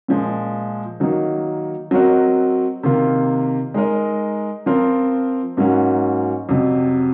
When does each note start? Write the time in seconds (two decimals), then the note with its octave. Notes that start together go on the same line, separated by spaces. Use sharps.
0.08 A#2 F3 G#3
1.00 D#3 F#3 A#3 D#4
1.91 F#3 C4 F#4 A#4 D#5
2.83 C3 D#3 A#3 F4
3.74 G#3 D#4 A#4 D#5
4.66 F3 C4 F4 A#4
5.57 G#2 F#3 A#3 C#4 F#4
6.49 F2 C3 F#3